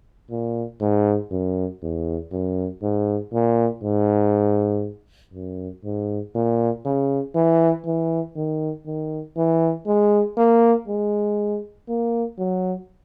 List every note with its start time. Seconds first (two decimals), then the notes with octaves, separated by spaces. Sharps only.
0.30 A#2
0.81 G#2
1.31 F#2
1.82 E2
2.32 F#2
2.82 G#2
3.32 A#2
3.83 G#2
5.34 F#2
5.84 G#2
6.35 A#2
6.85 C#3
7.35 E3
7.86 E3
8.36 D#3
8.86 D#3
9.37 E3
9.87 G#3
10.37 A#3
10.88 G#3
11.89 A#3
12.38 F#3